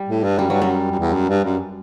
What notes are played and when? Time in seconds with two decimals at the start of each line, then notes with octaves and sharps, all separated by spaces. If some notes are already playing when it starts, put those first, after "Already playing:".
Already playing: G3
0.08 A2
0.23 G2
0.39 F#2 G3
0.50 G2 F#3
0.62 F#2 G3
0.91 F#2
0.99 E2
1.14 F#2
1.29 G2
1.44 F#2